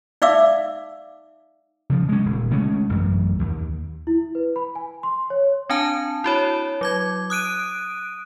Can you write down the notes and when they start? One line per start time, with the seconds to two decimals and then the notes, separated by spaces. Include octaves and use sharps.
0.22 D#4 D5 E5 F5 D6 E6
1.90 C#3 F3
2.09 G#3 C#4
2.25 D#1
2.51 C#3 G#3 A3 C#4
2.89 A1 F#2
3.39 D#2
4.07 E4
4.35 B4
4.56 B5
4.75 G#5
5.03 C6
5.30 C#5
5.70 C4 D4 G#5 A5
6.24 E4 F#4 C#5
6.81 F#3 D6 G#6
7.30 D#6 F#6 D7 D#7